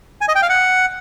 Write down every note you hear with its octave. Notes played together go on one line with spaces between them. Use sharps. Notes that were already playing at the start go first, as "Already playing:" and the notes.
G#5
D#5
G5
F5
F#5